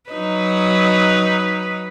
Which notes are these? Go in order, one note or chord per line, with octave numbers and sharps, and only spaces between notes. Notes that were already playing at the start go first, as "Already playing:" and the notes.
F#3 D#4 B4